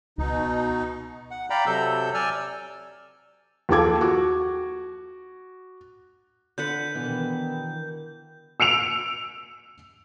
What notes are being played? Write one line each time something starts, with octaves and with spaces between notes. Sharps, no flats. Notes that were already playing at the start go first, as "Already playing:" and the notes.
C#2 B2 D#4
F#5
D5 F5 G5 A#5 B5
C3 F#3 A4 E6 G6
D5 G#5 E6 F6
D#2 F3 G#4 A4 D6 G#6
F#4 D6
D3 B4 F#5 G6
B2 D#3 E3
E6 C#7 D7 F7